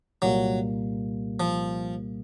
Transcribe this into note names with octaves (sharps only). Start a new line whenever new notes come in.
C2 A#2 F#3 G3 A#3
F3